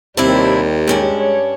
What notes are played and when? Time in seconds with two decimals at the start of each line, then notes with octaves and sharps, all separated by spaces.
0.17 D#2 C3 G3 C4 D4 E4
0.88 G2 G#3 C#4 D4 G4
1.19 C#5